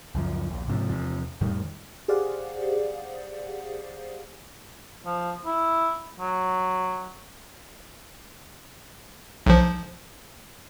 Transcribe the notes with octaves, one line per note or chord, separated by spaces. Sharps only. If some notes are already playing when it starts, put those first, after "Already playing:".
C#2 F#2 F3
A#1 D#2
G#2 C3 F3
E2 C3 F3
F2 A2 D#3 G3
G4 G#4 C5 D5 F5 F#5
F3
E4
F#3
B1 F3